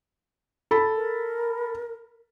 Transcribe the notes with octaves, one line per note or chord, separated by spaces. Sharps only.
A4 B5
A#4